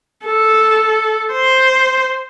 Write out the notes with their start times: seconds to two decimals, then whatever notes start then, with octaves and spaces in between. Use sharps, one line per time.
0.25 A4
1.33 C5